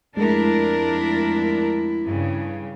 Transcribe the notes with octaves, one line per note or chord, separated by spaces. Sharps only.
F2 G#3 A3 D4 E4 A#4
G2 C#3